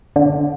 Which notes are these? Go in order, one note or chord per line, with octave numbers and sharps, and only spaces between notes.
D3